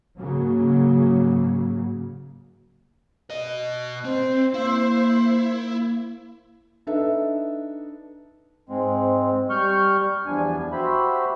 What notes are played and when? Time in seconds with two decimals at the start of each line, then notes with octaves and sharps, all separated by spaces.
0.17 G#2 C#3 F#3 A#3
3.30 B2 D#5
4.04 C4 C5
4.54 A#3 E4
6.87 D4 D#4 A4 B4 D#5 E5
8.69 G#2 G#3 C4
9.50 G3 C#6 F6 G6
10.26 E2 F3 G3 D4 G#5
10.72 F#4 G4 C5 E5 B5